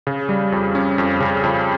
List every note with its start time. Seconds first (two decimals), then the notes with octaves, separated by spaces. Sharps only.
0.07 C#3
0.29 G3
0.52 F2
0.75 C#4
0.98 F2
1.20 C#3
1.43 F2